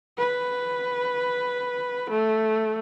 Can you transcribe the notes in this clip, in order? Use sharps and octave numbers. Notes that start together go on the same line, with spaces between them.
B4
A3